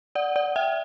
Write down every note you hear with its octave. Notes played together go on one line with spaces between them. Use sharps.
D5 F#5
D5 F#5
E5 G5